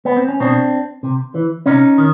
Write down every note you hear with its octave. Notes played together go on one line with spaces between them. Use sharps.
B3
C4
C#4
B2 C4 D4
C3
E3
C3 C#4 D#4
D#3